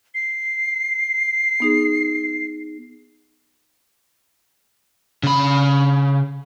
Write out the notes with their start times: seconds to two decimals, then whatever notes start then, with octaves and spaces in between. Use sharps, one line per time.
0.15 C7
1.60 B3 D#4 G#4
5.23 C#3 B5